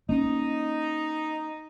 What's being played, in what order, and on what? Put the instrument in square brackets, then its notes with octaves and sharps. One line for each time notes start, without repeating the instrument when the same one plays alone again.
[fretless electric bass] A#3 C#4 [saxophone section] D#4